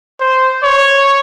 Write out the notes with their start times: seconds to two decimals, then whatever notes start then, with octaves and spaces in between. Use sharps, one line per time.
0.21 C5
0.63 C#5